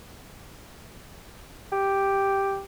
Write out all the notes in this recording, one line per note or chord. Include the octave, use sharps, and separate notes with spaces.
G4